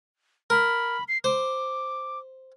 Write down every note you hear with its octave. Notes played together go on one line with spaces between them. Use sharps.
A#4 B5
C7
C5 D6